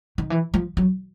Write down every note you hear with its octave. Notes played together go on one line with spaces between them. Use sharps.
D#3
E3
F3
F#3